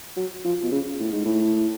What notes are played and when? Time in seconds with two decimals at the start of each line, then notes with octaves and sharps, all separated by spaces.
0.16 F#3
0.45 F3
0.63 B2
0.72 C#3
1.00 A2
1.12 G#2
1.25 A2